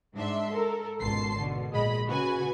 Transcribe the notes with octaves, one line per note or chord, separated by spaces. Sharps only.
G#2 D4 E5 C6
A4 A#4
G#1 C#2 B2 A5 C6 C7
B2 D3
A#1 G#3 D#5 B5
C#3 F#4 B4 G#5